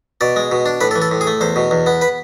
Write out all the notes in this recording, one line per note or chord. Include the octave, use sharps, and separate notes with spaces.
B2 D5
G#3
B2
D4
A2 B4
A4
E3
A4
A2
G#4
A3
E2 C5
B2
E2
B3
B4